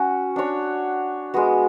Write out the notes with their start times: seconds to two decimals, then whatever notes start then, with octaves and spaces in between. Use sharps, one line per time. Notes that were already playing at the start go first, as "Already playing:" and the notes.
Already playing: C#4 F#4
0.36 D4 F#4 C#5
1.34 G#3 B3 F#4